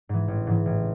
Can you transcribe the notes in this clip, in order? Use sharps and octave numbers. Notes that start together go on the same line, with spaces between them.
G#2 E3
A1
G#2 E3
A1